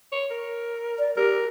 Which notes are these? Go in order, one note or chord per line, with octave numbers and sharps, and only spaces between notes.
C#5
A#4
D5
G4 A#4